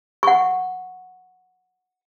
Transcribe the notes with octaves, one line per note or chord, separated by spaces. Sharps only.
F#5 C#6